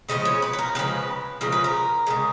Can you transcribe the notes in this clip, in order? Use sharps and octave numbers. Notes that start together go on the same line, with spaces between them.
C#3 F3 G#3 D#5
C#5
B4
B4
A#4
C#3 F3 G#3 B4
C#3 F3 G#3 A#4
B4
A#4
C#3 F3 G#3